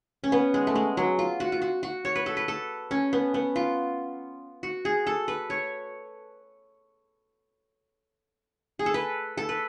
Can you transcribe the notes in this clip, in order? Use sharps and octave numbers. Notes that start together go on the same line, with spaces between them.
C#4
B3
G#3
A3
G#3
F#3
F4
F#4
F4
F#4
F#4
C#5
B4
A4
B4
A4
C#4
B3
B3
F4
F#4
G#4
A4
B4
C#5
G#4
A4
B4
A4
B4